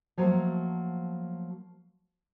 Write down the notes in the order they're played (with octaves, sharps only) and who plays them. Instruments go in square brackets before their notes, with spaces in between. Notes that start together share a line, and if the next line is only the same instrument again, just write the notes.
[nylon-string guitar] F3 F#3 A3 A#3